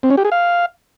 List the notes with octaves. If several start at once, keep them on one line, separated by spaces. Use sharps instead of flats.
C4
C#4
G4
G#4
F5